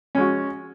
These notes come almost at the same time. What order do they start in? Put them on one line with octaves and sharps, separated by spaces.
C#4 G#3 F#4